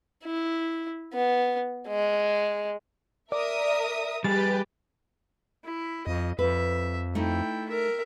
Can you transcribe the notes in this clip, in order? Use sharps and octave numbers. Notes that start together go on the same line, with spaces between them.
E4
B3
G#3
A#4 D5 E5 D#6
G3 G4 G#4 B4 A6
E4
F2 D#5
F2 B4 E5
A3 D#4 E4 G5
A#4 E5